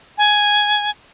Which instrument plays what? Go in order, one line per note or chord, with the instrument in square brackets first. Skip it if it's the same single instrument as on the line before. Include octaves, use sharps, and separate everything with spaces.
[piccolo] G#5